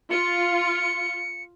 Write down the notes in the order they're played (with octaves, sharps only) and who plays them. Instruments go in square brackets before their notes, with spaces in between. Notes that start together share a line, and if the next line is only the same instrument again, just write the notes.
[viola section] F4 [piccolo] C#7